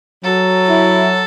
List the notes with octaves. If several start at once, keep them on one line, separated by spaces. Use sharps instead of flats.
F#3 A4
E4